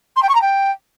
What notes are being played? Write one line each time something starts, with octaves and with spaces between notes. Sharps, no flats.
C6
G5
C#6
A#5
G5